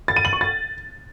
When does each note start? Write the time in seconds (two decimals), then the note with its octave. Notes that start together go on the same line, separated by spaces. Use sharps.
0.08 A6
0.16 D#7
0.25 F#7
0.33 C#6
0.41 A6